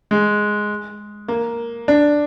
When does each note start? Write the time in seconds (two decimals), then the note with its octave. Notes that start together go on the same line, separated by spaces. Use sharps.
0.11 G#3
1.28 A#3
1.88 D4